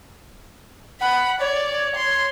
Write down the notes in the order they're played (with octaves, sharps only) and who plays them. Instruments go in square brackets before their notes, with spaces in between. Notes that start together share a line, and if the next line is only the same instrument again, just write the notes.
[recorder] F#5 [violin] B5
[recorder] C#5 [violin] D5
[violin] C6